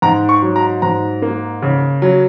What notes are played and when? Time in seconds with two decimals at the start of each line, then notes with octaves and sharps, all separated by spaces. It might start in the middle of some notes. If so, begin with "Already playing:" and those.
0.02 G#2 A#5
0.29 C#6
0.42 F#3
0.56 A#5
0.82 G#2 A#5
1.22 A#3
1.62 C#3
2.02 F#3